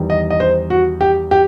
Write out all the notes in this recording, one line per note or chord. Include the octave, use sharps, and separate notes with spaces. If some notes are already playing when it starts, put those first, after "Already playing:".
Already playing: E2 D#3 G3
D#5
D#5
C5
F#4
G4
G4